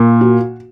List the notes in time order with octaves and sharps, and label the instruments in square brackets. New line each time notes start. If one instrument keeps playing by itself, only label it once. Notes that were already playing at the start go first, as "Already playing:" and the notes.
Already playing: [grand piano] A#2 [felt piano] A#3
[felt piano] F#4